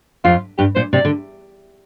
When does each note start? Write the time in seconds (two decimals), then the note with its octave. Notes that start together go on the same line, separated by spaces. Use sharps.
0.24 F2 F4
0.58 G2 G4
0.76 A#2 C5
0.93 C3 D5
1.05 D3